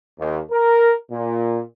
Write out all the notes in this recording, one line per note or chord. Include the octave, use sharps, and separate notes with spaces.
D#2
A#4
A#2